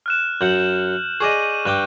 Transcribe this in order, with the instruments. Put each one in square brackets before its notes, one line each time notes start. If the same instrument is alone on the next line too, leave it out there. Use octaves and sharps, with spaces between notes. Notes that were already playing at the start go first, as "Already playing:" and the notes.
[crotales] F6 F#6 E7
[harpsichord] F#2 F#5 [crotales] G6 F#7
[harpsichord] G#4 D5 D#5 [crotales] C#6 D#7
[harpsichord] G2 G5 D6 [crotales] F#6 G6